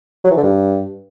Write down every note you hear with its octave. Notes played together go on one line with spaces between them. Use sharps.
F#3
E3
D3
G2